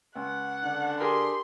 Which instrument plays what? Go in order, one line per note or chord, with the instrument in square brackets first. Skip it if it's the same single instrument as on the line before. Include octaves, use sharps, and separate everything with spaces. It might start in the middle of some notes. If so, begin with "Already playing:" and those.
[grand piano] C#2 [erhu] F#5
[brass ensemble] D3 D4
[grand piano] G4 G#4 A#4 [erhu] C6